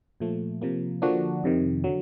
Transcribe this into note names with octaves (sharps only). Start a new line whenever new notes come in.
A#2 F3 A3
C3 F3 A#3
D3 F3 A#3 D4 F#4
F2 C3 D#3
D3 F#3